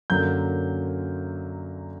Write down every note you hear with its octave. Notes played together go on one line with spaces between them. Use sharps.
F#2 D3 F#3 A#3 G6